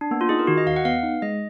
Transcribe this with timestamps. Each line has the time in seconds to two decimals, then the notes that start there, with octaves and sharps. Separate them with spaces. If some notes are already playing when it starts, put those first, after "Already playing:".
0.01 D4
0.11 A#3 B3
0.21 F4
0.29 D#4 G#4
0.39 A#4
0.47 D#3 F#4
0.58 D#5
0.67 D#2 F5
0.76 F#5
0.85 B3 F5
1.03 D#4
1.22 G#3 D#5